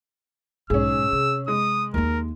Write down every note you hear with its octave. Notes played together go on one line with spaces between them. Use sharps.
B1 G#2 C#4 G#4 E6
C3
G#3 D#6
D#2 A#3 A#4